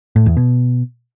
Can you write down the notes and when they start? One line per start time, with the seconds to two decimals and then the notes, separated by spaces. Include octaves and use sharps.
0.16 A2
0.26 E2
0.37 B2